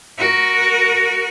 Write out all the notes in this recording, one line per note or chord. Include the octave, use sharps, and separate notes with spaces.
F#4 A#4